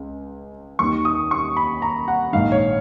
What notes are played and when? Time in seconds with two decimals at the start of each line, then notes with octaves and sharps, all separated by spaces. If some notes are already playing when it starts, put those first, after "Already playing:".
Already playing: C#2
0.79 D#2 D#3 C#6
1.05 D#6
1.31 C#6
1.57 B5
1.82 A#5
2.08 F#5
2.33 A#1 G#2 D#3 F5
2.52 C#5